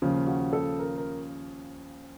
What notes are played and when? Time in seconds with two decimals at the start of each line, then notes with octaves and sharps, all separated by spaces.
0.02 D#2 C#3 F3
0.27 F#4
0.53 A4
0.79 A#4
0.98 A#4